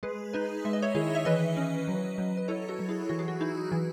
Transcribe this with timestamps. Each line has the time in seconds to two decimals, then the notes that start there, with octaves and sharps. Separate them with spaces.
0.03 G#3 G#4 B4
0.33 D#4 B4 D#5
0.65 G#3 E5
0.73 D#5
0.82 C#5 E5
0.95 D#3 E4 G#4
1.15 E5
1.25 E3 B4 D#5
1.57 C#4
1.88 F#3
2.18 F#3
2.37 B4
2.48 E4 A4 C#5
2.69 F#4 A4
2.79 F#3
2.89 E4 G#4
3.09 E3 F#4
3.19 G#4
3.28 F#4
3.40 D#4 E4
3.72 E3